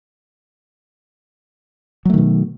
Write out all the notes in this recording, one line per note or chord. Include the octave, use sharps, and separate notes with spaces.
B2 D#3 F#3 A3